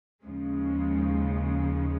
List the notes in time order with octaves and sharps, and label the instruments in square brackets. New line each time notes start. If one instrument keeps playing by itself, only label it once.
[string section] D#2 C#3 F3 G#3